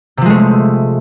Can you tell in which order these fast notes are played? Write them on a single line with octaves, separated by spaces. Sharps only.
C3 F3 G#3 A3